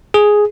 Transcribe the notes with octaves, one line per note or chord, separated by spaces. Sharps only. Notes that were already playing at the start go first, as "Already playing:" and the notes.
G#4